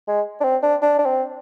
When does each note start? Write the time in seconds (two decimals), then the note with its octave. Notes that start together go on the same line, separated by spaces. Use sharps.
0.08 G#3
0.40 D4
0.44 C4
0.63 D4
0.82 D4
0.99 D4
1.06 C4